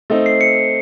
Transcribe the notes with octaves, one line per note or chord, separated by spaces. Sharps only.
A3 C4 D#4
C7
C#7